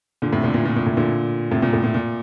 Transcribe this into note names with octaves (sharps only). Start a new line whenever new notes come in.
A#2 D3
A2 C3
A#2 D3
A#2
A#2
A#2
A2
A#2 D3
A2 C3
A#2
A2
A#2
A#2